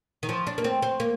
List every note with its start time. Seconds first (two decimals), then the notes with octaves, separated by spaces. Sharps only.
0.23 D#3
0.29 F3
0.47 D4
0.58 A#3
0.64 C4
0.82 C4
1.00 A#3